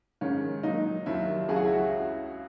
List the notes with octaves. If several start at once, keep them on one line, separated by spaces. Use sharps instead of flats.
G#2 D#3 G#3 C#4
A#2 F#3 D#4
D#2 D#3 F#3 E4
C#2 C#3 F#3 G#4
F#4
E4
F#4